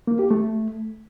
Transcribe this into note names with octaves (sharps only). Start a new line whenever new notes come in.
A#3
G4
A3